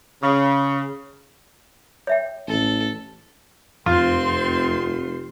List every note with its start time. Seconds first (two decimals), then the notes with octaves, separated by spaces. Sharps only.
0.23 C#3
2.07 C#5 E5 G5
2.48 A1 A4
3.86 F1 F2 C4 F4 C6